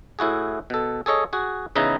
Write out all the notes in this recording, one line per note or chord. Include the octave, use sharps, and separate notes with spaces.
A2 E4 F#4 G#4
B2 A4
G#4 A4 C#5 D#5
F#4 G#4
E2 C#3 D#4 E4 B4 A#5